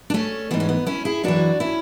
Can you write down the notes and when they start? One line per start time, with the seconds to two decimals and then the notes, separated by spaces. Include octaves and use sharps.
0.10 D4
0.14 A3 C#4
0.51 G#2 E3 B3
0.60 C#4
0.69 B3
0.87 C#4 E4
1.05 E4 G#4
1.24 F#2 E3 D4 F#4
1.60 C#4 E4